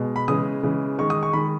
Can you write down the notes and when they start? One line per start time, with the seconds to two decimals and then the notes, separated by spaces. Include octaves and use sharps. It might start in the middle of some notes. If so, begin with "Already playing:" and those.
Already playing: B2 G#3
0.16 B5
0.28 C#3 E3 G#3 D#6
0.63 C#3 E3 G#3
0.98 D#3 G#3 C#6
1.10 D#6
1.23 C#6
1.33 D#3 G#3 B5